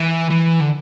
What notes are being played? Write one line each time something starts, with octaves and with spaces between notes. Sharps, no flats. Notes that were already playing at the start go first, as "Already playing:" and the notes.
Already playing: E3
E3
D3